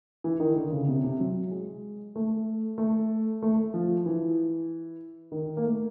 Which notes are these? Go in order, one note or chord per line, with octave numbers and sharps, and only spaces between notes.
E3
D#3
D3
C#3
C3
C3
F#3
G#3
A3
A3
A3
F3
E3
D#3
A#3
A3